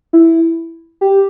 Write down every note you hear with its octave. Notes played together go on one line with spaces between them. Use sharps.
E4
G4